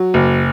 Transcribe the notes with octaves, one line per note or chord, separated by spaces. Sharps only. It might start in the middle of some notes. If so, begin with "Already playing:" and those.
Already playing: F#3
F#1